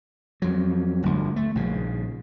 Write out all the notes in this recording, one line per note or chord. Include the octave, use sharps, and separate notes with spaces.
F2 F#3
G1 D2
A3
A#1 C#3